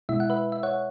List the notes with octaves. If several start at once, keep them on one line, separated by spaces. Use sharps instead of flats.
B2 G#3 E4 E5
F#5
B4 E5
E5
C#5 F#5